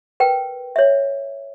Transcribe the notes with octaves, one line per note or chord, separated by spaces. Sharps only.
A#4 B4 G5
C#5 E5